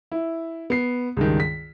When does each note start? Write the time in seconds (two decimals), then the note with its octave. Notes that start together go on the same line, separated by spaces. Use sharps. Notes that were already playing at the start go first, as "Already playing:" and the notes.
0.12 E4
0.70 B3 C7
1.17 C#2 G2 D#3
1.40 B6